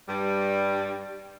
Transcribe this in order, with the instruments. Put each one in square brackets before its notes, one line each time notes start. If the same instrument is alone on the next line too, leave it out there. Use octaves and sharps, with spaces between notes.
[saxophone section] G2 G3